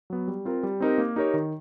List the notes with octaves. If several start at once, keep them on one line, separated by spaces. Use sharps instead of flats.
F#3 B3
G3
C4 F4 A#4
G3
C4 D#4 G4 A#4
A#3
D#4 G4 A#4 C#5
D#3